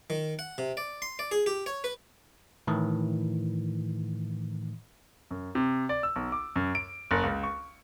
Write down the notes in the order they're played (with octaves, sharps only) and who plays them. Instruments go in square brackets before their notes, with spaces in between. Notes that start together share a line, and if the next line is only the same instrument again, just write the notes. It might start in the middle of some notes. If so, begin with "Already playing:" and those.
[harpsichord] D#3
F#5
C3
D5
C6
D5
G#4
G4
C#5
B4
[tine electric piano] A2 D#3 E3
[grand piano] F#2
C3
D5
E6
B1
D6
F#2
D7
F#1
C#2
C#6